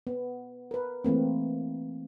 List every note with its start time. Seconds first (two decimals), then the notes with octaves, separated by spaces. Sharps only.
0.07 B3
0.71 A#4 B4
1.04 E3 A3 A#3 C4